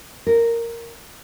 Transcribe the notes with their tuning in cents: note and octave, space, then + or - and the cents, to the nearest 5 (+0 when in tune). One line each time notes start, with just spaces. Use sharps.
A#4 -10